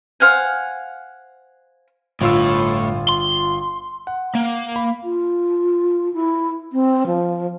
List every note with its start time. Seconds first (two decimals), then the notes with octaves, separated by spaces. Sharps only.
0.20 C5 F5 F#5 G#5
2.21 G1 A2 F4 E6
3.09 C6
4.07 F#5
4.35 A#3
4.76 B5
5.04 F4
6.14 E4
6.72 C4
7.06 F3